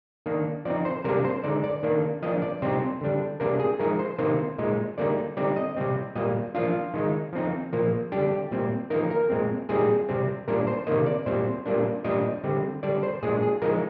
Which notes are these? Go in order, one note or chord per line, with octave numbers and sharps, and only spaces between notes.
D#3 A#3 D4
F3 C4 D#4 D5
C5
C3 G3 A#3 D4 A#4
C5
D3 G#3 D#4 D5
D5
D#3 A#3 D4
F3 A#3 D4 D#5
D5
C3 G3 C4 D#4 C5
D3 G3 D4
C3 G3 A#3 D4 A#4
G#4
F3 G#3 D#4 A#4
C5
C3 D#3 A#3 D#4 C5
A#2 G#3 D#4
D3 G3 A#3 D#4 D5
D3 G3 C4 D#4 D5
D#5
C3 G3 C4
A#2 G3 A#3 D#5
F3 A#3 D4 F4
D#3 G#3 D#4
F3 C4 D#4
A#2 F3 A#3
D3 G3 D4 G4
A#2 G3 C4
F3 A#3 D#4 A#4
A#4
A#2 G#3 C4
A#2 G3 C4 D#4 G#4
C3 G3 C4
A#2 G3 D4 A#4
C5
C3 D#3 A#3 D#5
D5
A#2 G3 C4 C5
A#2 G3 A#3 D4
A#2 G3 D4 D#5
D3 G3 C4
D3 G3 D4 D5
C5
A#2 G#3 D4 G#4
G#4
F3 G#3 D#4 A#4